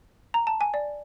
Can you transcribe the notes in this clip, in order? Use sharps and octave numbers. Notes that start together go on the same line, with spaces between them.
A#5
A5
G#5
D5